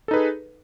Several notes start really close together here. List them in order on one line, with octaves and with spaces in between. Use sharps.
A4 D#4 B4 G#4